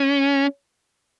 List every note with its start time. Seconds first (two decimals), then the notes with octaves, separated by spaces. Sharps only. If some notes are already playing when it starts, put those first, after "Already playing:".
Already playing: C#4